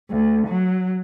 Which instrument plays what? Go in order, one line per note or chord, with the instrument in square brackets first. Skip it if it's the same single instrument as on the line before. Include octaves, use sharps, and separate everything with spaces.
[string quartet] D2
F#3